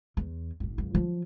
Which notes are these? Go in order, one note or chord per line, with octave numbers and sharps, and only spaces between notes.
E2
F#1 A2
C#2 F#2
F3 F#3